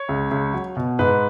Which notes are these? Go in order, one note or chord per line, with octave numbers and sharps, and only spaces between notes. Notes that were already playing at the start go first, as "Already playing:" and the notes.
Already playing: C#5
C#2
C#2
F#3
B2
G#2 B4